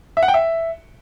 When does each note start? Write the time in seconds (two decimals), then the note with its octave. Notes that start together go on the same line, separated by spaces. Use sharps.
0.17 E5
0.23 F#5
0.28 G5
0.34 E5